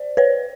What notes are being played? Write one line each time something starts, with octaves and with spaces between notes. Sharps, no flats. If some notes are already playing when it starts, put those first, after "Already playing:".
Already playing: C5 D5
B4 C#5